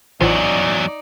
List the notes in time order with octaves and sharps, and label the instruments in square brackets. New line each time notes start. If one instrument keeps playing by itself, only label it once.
[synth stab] A1 F3 C7 [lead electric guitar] E2 F#3 [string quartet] D#4 D5